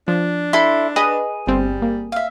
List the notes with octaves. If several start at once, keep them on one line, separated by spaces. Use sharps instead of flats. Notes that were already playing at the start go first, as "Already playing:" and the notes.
F3 D4
E4 A4 C6
G#4 B4 D#5
G1 G3 C4
A#3
E5 F5